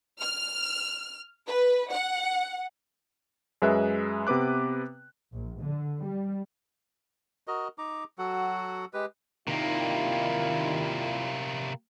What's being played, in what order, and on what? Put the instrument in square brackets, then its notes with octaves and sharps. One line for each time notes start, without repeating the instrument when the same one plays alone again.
[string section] F6
B4
F#5
[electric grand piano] F#2 G#3 B4 E5 F#6
C3 B3 B4 D6 F#6
[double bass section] A#1
D3
G3
[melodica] F#4 A#4 D#5
D#4 A#5 D6
F#3 F#4 A4 F#5
G#3 G4 B4
[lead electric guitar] C3 A#3 [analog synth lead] D#3 [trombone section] G3 E4 F4